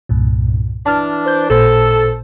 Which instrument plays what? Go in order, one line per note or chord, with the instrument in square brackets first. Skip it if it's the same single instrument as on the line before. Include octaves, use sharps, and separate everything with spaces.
[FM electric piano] C2 G2 A#2
[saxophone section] E3 D4 [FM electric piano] A5 F6
[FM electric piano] C5 G6
[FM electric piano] A1 A#2 C5 [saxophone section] A4